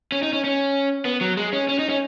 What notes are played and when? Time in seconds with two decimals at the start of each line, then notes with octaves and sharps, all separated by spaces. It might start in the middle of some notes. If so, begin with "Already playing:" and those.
0.12 C#4
0.22 D#4
0.33 C#4
0.44 C#4
1.05 B3
1.21 F#3
1.37 G#3
1.53 C#4
1.69 C#4
1.79 D#4
1.89 C#4